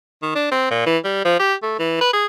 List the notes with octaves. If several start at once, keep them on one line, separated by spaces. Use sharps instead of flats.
D#3
D4
C4
A#2
E3
G3
F3
G4
A3
E3
B4
G#4